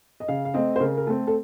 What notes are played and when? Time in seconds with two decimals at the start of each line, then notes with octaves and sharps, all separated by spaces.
0.20 D#5
0.28 C#3 F5
0.45 F5
0.54 A3 C4 D#5
0.76 C5
0.80 C#3 A#4
0.97 A#4
1.07 A3 C4 A4
1.27 A4